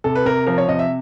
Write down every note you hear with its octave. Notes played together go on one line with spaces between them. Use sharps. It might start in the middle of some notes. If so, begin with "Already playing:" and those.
C3 A4
B4
C3 A#4
F3 A#4
C#5
C3 D#5
E5